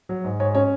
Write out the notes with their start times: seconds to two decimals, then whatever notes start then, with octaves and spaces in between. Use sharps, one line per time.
0.09 F#3
0.24 G#2
0.40 G#2 C#5
0.55 C#4 C#5